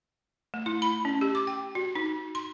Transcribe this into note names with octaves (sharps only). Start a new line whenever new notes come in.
A3
E4
B5
C#4
G4
D6
G5
F#4
D#4
C6